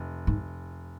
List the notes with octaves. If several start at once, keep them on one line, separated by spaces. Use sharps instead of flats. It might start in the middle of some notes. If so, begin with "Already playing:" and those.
Already playing: F1
G#2